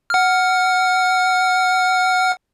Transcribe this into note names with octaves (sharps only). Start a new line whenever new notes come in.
F#5 F6